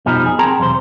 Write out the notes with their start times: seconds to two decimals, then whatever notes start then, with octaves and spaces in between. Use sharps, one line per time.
0.06 F2 B2 F3 G3 D#4
0.26 G#4
0.39 C4 G#4 A#4 G5 A5 A#5
0.58 B1 E2 C3 C5